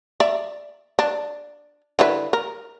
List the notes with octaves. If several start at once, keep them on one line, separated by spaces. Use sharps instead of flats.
D5 E5
D4
D3 E4 B4
A#4